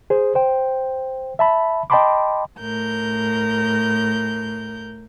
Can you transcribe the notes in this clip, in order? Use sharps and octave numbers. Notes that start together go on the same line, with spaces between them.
G#4 C5
C5 G5
E5 A5 B5
D#5 G5 A5 B5 C6 D6
A2 A#4 G6